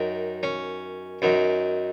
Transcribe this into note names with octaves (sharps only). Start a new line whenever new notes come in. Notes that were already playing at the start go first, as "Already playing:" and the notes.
Already playing: F#2 D#3
C#4
F#2 D#3